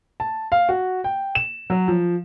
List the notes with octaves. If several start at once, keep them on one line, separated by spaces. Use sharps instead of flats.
A5
F5
F#4
G5
E7
F#3
F3